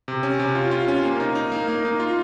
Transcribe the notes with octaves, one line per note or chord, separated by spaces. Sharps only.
C3
C#4
C3
F4
F4
C#4
A#3
D#4
D#4
A#3
A#3
D#4
F4